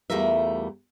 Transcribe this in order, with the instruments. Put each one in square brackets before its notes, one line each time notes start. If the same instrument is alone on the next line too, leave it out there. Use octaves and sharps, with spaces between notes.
[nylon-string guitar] E2 G3 A3 F4 A#4 E5